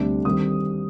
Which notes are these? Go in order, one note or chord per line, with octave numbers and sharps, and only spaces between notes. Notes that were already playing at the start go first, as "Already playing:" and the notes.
Already playing: D2 C3 G3 D4
D#3 G3 C4 D#6